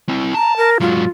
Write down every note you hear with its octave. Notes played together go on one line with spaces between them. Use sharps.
C4 E4
A5 A#5
A#4
G#2 F#3 F4